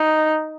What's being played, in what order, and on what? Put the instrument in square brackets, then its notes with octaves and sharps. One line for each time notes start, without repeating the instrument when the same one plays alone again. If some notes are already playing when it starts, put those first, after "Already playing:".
Already playing: [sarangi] D#4